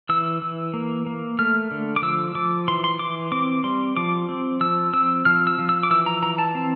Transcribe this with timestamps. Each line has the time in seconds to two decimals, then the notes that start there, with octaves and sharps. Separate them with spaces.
0.09 E3 E6
0.42 E3
0.74 A#3
1.06 A#3
1.39 A3 F6
1.71 D3
1.96 D6
2.02 F3 E6
2.35 F3 D6
2.68 E3 C6
2.84 C6
2.99 E3 D6
3.32 C4 D6
3.64 G3 C6
3.97 F3 D6
4.29 C4
4.60 F3 E6
4.93 C4 E6
5.25 F3 F6
5.47 E6
5.59 F3
5.69 E6
5.83 D6
5.90 E3 E6
6.06 A#5
6.22 E3 A#5
6.38 A5
6.55 C4